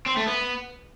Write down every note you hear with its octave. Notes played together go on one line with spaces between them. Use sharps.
C4
A3
B3